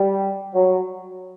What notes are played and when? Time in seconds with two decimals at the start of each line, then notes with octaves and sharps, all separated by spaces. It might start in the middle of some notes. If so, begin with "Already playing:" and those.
Already playing: G3
0.54 F#3